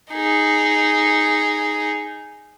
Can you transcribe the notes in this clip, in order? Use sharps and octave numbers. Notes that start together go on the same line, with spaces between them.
D#4 G#4